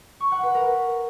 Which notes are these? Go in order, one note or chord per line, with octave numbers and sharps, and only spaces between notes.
C#6
F#5
B4
A#4